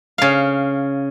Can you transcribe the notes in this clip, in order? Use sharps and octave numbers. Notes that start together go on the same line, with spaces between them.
C#3 F5